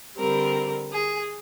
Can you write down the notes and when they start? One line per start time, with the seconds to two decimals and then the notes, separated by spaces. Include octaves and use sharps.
0.18 D3 G3 C4 A#4
0.92 G#4